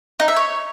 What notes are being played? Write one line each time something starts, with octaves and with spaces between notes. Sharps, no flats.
D#4
E5
C#5